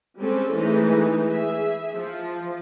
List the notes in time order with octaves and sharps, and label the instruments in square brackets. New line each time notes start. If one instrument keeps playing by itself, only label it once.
[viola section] G3 G#3 C4 C#4 A4
E3 G#3 A3 D#4
G#4 E5
F3